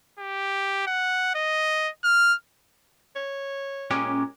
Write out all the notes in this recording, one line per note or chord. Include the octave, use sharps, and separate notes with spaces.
G4
F#5
D#5
F6
C#5
A#2 G#3 C#4 G4